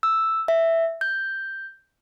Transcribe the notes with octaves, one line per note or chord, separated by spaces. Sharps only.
E6
E5
G6